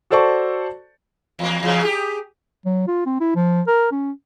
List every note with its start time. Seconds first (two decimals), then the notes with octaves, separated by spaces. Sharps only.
0.10 F#4 A4 C5 D5 A5 C#6
1.39 E2 A#3
1.63 E2 G#2 C#3
1.82 G4 G#4
2.65 F#3
2.87 F4
3.06 C4
3.21 E4
3.36 F3
3.67 A#4
3.92 C#4